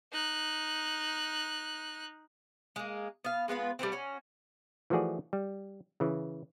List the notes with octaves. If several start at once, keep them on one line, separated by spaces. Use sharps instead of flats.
D#4 F#6
G#3 A#3
B3 F5
G#3 B3 F4 B4
G3 A3 B3 C4
C#4 F#4
E3 F3 A3 F#4 G#4 D5
G3
C#3 E3